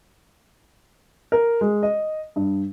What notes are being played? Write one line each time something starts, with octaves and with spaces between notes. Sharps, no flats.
A#4
G#3
D#5
G2